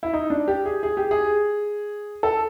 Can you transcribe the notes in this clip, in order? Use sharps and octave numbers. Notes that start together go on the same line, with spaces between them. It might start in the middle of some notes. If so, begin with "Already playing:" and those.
E4
D#4
D4
G4
G#4
G#4
G4
G#4
A4